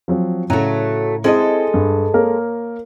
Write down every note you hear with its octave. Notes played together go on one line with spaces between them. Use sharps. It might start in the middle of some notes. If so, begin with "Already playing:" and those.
F3 F#3 C4
A2 C#3 F#3 A3 A#5
G#3 C4 E4 G#4 A4 D#5
G2
A#3 A#4 C#5